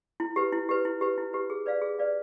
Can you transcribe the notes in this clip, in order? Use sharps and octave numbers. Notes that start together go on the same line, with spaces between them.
E4
G4 B4
E4
G4 B4
E4
G4 B4
E4
G4 B4
G#4
B4 D5 F5
G#4
B4 D5 F5